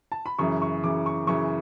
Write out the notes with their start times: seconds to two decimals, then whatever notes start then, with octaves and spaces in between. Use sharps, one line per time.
0.12 A5
0.26 B5
0.38 F#2 C#3 E3 C#6
0.62 C#6
0.84 F#2 C#3 E3 D6
1.06 C#6
1.27 F#2 C#3 E3 C#6